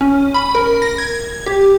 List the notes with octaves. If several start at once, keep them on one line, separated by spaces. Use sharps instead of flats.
C#4
B5
A#4
A#6
G#6
G4